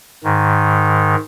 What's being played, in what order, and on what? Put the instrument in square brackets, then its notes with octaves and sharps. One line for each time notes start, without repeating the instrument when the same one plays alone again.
[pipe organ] G#2 D#3